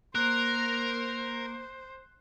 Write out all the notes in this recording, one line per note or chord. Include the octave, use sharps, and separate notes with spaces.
A#3 A#4 C5 F#6